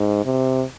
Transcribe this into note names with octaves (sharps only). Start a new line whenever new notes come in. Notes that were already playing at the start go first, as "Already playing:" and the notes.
Already playing: G#2
C3